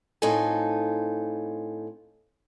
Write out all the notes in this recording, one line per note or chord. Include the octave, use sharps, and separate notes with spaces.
A2 C4 D#4 F4 A4 G#5